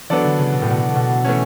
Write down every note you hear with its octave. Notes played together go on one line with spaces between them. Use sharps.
E3 F#3 B3 D4 A4 D5
D3
C#3
B2
A2
B2
B2
E3 A3 C#4